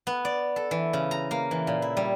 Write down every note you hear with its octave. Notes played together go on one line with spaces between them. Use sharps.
B3
D5
A4
E3
C#3
A#5
A#3
E3
A#2
E4
G3